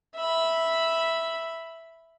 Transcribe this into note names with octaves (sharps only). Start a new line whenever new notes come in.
E5 B5